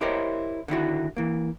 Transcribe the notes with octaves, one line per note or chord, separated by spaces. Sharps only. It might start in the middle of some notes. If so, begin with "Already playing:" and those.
E4 G4 A#4 C5 C#5 D#5
D3 D#3 E4 F#4
E3 A#3